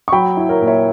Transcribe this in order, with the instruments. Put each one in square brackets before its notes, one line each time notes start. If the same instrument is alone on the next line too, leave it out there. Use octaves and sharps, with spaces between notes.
[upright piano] C#6
F#3 G5 B5
E4
A#4 C#5
A#2
C#5 E5